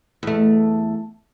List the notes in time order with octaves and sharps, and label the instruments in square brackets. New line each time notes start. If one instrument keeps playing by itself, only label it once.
[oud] E2 A3